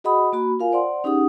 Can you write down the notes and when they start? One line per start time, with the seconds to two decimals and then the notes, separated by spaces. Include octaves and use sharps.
0.04 F#4 G#4 D#5 F#5 B5 D#6
0.33 A#3 F#4 B5
0.60 F4 A#4 F5 G#5
0.72 C5 D5 F#5 C6
1.04 C#4 D#4 G4 G#4 F#5 D#6